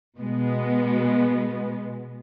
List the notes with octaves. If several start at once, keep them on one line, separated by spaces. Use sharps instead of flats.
B2 G#3 B3